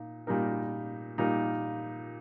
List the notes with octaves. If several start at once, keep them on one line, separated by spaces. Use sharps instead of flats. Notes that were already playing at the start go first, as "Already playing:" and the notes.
Already playing: A#2 D#4
A#2 G3 D#4 A#4
A#2 G3 D#4 A#4